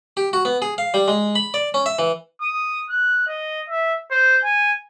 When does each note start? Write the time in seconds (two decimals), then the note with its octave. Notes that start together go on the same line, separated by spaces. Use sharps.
0.17 G4
0.33 F#4
0.45 B3
0.62 G#4
0.78 F5
0.94 G3
1.08 G#3
1.35 B5
1.54 D5
1.74 C#4
1.86 E5
1.99 E3
2.41 D#6
2.90 F#6
3.28 D#5
3.69 E5
4.11 C5
4.44 G#5